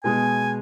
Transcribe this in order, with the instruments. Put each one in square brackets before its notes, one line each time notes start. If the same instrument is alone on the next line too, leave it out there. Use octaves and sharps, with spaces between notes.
[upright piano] B2 G#3 B3 [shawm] G#5